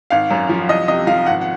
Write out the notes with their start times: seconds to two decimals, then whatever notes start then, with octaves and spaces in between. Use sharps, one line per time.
0.10 G#1 F5
0.30 F#2
0.49 F3
0.69 C2 D#5
0.88 C3 D#5
1.07 F3 F5
1.26 G#1 F#5
1.41 F#5